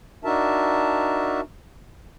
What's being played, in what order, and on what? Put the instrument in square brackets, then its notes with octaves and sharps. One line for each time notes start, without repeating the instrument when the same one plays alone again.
[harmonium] D4 D#4 F#4 A#4 E5 A5